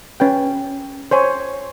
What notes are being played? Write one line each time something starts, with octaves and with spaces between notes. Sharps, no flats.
C#4 B4 G5
C5 C#5 G#5